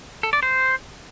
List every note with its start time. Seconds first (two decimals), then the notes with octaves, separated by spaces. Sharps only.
0.23 A4
0.33 D5
0.43 C5